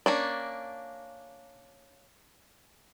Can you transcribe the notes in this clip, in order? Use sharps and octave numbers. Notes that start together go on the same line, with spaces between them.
A#3 C#4 D4